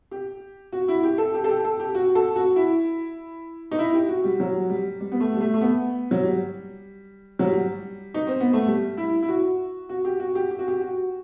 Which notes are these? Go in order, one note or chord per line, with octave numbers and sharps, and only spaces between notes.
G4
F#4
E4
G4
A4
G4
A4
G4
A4
G4
F#4
A4
F#4
E4
D#4
E4
G4
F#4
G3
F#3
G3
G3
B3
A3
G3
A3
A3
B3
F#3
G3
F#3
G3
D#4
C4
B3
A3
G3
E4
E4
F#4
F#4
G4
F#4
G4
G4
F#4
G4
F#4